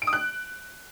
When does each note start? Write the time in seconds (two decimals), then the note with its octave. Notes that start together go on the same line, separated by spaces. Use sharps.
0.02 D7
0.07 D#6
0.13 F#6